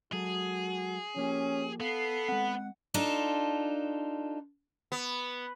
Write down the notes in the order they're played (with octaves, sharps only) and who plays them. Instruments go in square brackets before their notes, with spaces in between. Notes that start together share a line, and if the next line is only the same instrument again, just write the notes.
[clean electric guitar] F#3 G#3 A4 [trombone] F#4 [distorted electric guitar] G#4
[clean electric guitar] F3 A#3 G4 [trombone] C#4
[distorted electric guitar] B3 [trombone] A4 [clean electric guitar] F5 [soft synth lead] C7
[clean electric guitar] G#3 C4 [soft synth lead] F#5
[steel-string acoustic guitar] D4 D#4 F4 A4
[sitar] B3